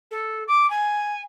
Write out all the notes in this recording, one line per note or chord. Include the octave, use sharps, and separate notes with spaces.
A4
D6
G#5